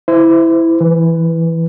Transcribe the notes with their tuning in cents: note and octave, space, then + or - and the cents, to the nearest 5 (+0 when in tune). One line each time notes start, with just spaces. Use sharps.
E4 +0 C5 -35
E3 +0 B4 +0